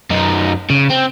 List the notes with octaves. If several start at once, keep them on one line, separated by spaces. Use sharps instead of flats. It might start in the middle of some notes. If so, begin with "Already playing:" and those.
F#2 D#4
C#3
C4